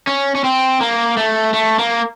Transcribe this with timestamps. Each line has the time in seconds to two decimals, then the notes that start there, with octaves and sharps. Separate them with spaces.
0.07 C#4
0.35 C#4
0.44 C4
0.81 A#3
1.17 A3
1.54 A3
1.79 A#3